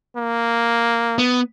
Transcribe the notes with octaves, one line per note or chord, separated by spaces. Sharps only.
A#3
B3